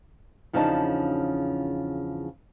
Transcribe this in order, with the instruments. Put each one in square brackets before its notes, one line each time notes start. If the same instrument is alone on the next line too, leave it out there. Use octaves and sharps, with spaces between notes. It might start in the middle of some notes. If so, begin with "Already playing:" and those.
[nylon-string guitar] E2 C#3 F3 D4 D#4 A5